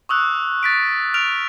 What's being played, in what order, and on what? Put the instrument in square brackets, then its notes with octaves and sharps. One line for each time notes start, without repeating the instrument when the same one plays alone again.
[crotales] C#6 D#6 E6 F#6
A6 B6 D7
F6 D7 F7